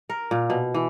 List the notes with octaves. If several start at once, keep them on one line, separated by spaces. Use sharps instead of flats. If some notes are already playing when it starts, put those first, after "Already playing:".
A#4
A#2
B2
E3